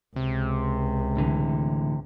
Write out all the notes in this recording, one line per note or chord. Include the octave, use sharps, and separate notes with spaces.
C#2 C3
A2 D3 E3